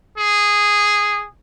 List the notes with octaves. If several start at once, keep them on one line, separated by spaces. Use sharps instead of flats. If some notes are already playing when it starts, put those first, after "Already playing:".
G#4